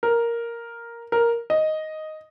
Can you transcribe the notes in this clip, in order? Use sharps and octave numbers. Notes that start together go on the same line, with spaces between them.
A#4
A#4
D#5